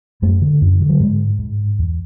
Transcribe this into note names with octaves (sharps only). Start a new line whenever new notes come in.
F#2 A3
D3
F#2
D3
F#3
G#2 G#3
G#2
E2